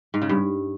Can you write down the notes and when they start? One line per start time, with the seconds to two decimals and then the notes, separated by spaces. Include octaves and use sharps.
0.14 G#2
0.22 C#3
0.29 G2